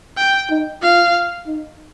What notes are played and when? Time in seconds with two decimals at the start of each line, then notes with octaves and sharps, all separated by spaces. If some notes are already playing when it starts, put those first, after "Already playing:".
0.17 G5
0.50 D#4
0.82 F4 F5
1.47 D#4